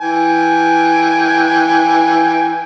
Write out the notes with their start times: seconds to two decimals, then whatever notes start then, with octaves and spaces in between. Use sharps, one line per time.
0.02 E3 G5 G#5